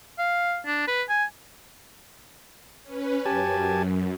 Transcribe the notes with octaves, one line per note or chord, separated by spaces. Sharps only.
F5
D4
B4
G#5
C#4 B4
F#2 G4 G#5 A5